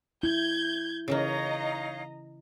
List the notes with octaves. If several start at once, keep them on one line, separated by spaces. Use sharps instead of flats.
E4 G6 G#6
C#3 E3 A#3 D#4 C#5 D#5 F5 A#5